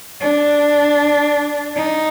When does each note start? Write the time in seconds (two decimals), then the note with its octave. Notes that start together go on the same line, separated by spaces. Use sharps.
0.21 D4
1.76 D#4